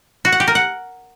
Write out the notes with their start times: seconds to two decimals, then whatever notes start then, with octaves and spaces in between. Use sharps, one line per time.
0.25 F#4
0.32 F#5
0.40 G4
0.48 A#4
0.55 F#5